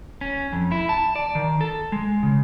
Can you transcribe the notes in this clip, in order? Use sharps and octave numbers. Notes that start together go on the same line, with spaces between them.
C#4
F2
E4
A5
D5
D#3
A4
G#3
C#3